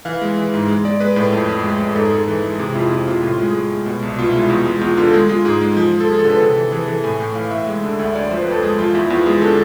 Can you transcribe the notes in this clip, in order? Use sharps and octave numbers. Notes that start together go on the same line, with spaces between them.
E3 F5
G#3
E3
G#2
G#3
G#3 D5
G#3 B4
A2 B4
F2
F2
G#3
F2
G#2 A4
G#4
G#3 A4
E3
G#3
C3 G#4
E4
F2 F4
C3 F4
C3 F4
A2 F4
F4
G#3 G#4
G#3
G#3
B2
C2
B2 F4
G#3 E4
F4
E2
G#3
E2 F4
D3 F4
A4
G#3 G#4
G#3 F4
G#2 G#4
G#3
F3
F3
A4
F3 G#4
A4
D3
B4
C3 A4
E3
E3 G#4
E3 A4
A2 G#5
A2
E3 F5
A2 E5
G#3
D3
D2 E5
D2 D5
F3 C5
B4
F2
A4
G#3 G#4
F3 F4
E2 E4
E2 F4
G#3 G#4
D3 A4